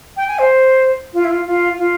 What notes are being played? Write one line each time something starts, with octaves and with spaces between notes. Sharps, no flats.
G5
G#5
C5
F4
E4
F4
F4
F4